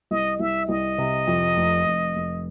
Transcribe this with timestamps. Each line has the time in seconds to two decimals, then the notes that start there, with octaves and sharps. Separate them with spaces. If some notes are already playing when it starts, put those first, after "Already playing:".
0.11 C2 D#5
0.40 C2 E5
0.68 C2 D#5
0.98 C3
1.27 F2
1.57 F1
1.86 F1
2.16 F1